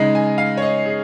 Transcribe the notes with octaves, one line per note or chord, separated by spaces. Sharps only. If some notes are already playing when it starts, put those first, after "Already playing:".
Already playing: C#3 G#3 D#4
G#5
F5
C#5
D#5
G#4